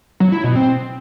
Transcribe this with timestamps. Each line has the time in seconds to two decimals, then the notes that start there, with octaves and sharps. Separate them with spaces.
0.20 F#3
0.32 E4
0.44 B2
0.55 C4